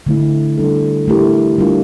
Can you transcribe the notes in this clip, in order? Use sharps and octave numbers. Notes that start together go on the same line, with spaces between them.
D3 A3 E4
G3 D4 A4
A3 E4 G4 A#4
G3 D4 F4 A#4